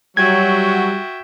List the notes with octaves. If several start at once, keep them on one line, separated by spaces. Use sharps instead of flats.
F#3 G3 F#4 E5 G5 G#6